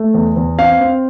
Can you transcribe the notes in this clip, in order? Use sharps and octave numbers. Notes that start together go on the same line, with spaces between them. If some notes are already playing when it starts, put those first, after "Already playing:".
Already playing: A3
E2
E2
C4 F5
C4